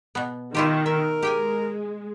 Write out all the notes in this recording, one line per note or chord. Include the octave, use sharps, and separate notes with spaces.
B2 B3
D#3 E4 F4 G4
A#4 E5
G#3 G4 G5 G#5